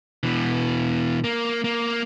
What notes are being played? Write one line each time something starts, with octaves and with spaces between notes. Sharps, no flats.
B2 E3
A#3
A#3